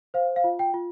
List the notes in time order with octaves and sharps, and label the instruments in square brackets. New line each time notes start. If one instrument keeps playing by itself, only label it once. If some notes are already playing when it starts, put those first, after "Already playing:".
[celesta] C5 F5
F5
F4
G5
F4